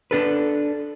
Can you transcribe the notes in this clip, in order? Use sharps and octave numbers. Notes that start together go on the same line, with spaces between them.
D4 A4 B4